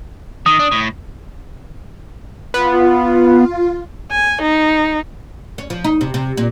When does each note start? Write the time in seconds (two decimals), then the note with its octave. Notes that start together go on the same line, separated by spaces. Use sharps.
0.46 D#3 D#6
0.59 D4
0.72 A2
2.54 B3 F4
4.11 G#5
4.42 D#4
5.58 C#4
5.70 F3
5.84 D#4
6.01 C3
6.14 C3
6.37 A#2